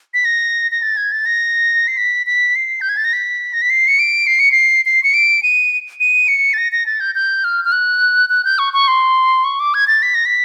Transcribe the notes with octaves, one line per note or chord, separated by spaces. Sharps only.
B6
A#6
A#6
A6
G#6
A6
A#6
C7
B6
B6
C7
G6
G#6
A6
A#6
B6
A#6
B6
C7
C#7
D7
C7
C#7
C7
C7
C#7
D7
D#7
D#7
C#7
A6
A#6
A#6
A6
G6
G6
F6
F6
F#6
F#6
G6
C#6
C#6
C6
C#6
D6
G#6
A6
B6
A#6
B6